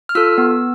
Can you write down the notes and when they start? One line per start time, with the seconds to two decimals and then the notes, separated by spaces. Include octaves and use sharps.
0.09 F6
0.15 F4 A4 E6
0.38 B3